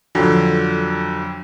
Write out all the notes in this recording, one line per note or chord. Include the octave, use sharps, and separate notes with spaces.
F2 D3 F#3